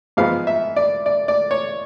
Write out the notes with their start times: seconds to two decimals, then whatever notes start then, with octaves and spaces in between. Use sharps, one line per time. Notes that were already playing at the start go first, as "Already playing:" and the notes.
0.17 G#2 F3 G#3 B3 F5
0.47 E5
0.76 D5
1.06 D5
1.28 D5
1.51 C#5